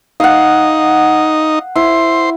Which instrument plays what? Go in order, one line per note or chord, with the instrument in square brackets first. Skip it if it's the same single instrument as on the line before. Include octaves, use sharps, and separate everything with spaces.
[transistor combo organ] D#4 [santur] F5 F#5
[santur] E4 [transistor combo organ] C5